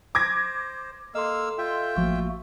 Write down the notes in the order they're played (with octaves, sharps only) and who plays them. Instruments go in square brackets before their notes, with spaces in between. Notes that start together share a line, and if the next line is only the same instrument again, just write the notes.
[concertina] C5 [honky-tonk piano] D6 G#6 A#6
[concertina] A#3 F5 E6 [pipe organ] A4 [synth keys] D#5 C6
[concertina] F4 E5 G5
[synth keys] A1 F3 [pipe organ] A3 A#3 F#4